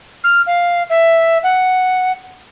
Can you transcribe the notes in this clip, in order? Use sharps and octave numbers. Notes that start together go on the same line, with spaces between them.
F6
F5
E5
F#5